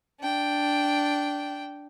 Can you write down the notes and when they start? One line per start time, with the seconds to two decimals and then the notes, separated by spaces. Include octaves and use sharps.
0.20 D4 G5